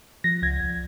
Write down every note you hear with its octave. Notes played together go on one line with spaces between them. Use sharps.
F3 A#6
C#2 G#6
C#2